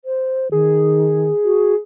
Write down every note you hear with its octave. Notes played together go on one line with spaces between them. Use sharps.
C5
D#3 G#4
F#4